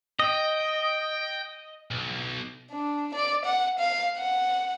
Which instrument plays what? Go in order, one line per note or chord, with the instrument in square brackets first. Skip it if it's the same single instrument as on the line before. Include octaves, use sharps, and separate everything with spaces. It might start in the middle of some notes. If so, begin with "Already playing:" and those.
[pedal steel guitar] D#5 [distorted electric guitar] G5
[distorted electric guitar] B1
[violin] D4
D5
F#5
F5
F#5